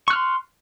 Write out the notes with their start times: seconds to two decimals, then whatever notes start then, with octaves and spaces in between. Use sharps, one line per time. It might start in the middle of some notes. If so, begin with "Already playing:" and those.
0.08 C#6
0.10 F#6
0.13 F6
0.16 C6